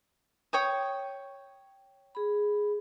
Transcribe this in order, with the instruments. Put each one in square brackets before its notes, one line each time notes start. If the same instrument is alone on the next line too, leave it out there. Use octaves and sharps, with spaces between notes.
[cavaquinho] C#5 G5 D#6
[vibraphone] G#4 B5